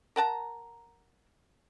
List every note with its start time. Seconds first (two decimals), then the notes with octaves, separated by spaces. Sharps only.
0.16 A#4 F#5 A5 A#5